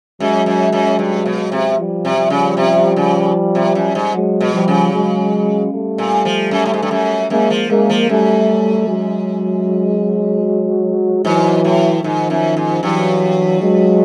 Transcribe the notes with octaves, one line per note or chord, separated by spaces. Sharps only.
F#2 F#3 G#3
F#2
F#2
G2
B2
C3
F3 G3
C3
F3 G3
C#3
C3
C#3
C3
F#2
G#2
F#3 G#3
B2
F3 G3
C#3
F#3 G#3
G3 A3
A#2
F3
F#2
A2
G#2
G2
F#2
F#2 G#3 A#3
F3
F#2 G#3 A#3
F3
F#2 G3 A3
F#3 G#3
G#2 E3 F#3
A2
G#2 D#3 F3
F#2
G#2
G2 E3 F#3
F#3 G#3